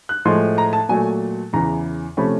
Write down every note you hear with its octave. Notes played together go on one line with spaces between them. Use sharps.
F#6
A2 F3 G#3 C6
A#5
A5
A#2 F#3 A3 G#5
E2 C#3 E3 A#5
C3 F3 A3 C#4 B5